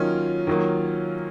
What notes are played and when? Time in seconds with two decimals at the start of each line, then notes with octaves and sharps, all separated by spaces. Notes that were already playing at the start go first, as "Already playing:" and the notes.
Already playing: D#3 F#3 A#3 C#4 D#4 F4
0.47 D#3 F#3 A#3